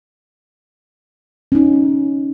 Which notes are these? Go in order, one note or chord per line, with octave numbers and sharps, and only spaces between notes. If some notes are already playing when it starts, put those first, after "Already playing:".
C#4 D#4